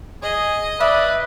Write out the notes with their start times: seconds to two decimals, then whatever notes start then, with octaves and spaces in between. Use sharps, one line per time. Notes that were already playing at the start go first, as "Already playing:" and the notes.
0.23 G#4 D#5
0.80 B4 D5 E5 D#6